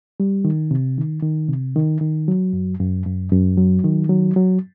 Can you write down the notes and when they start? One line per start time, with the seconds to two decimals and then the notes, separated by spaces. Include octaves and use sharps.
0.20 G3
0.45 D#3
0.71 C3
0.98 D#3
1.23 D#3
1.49 C3
1.76 D#3
2.01 D#3
2.28 F#3
2.53 F#2
2.79 F#2
3.06 F#2
3.32 F#2
3.58 F#3
3.84 D#3
4.09 F#3
4.36 F#3